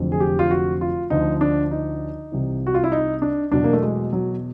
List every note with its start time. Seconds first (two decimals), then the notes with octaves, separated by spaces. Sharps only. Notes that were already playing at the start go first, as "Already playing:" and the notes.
Already playing: F1 F2 D3 F#3
0.12 G#4
0.20 G4
0.39 F4
0.51 F#4
0.81 F4
1.10 D2 D3 F3 D#4
1.41 D4
1.71 D#4
2.32 C2 C3 E3
2.67 F#4
2.74 F4
2.84 E4
2.92 D#4
3.22 D4
3.52 E2 B2 F#3 D4
3.64 A#3
3.73 A3
3.82 G#3
4.13 F#3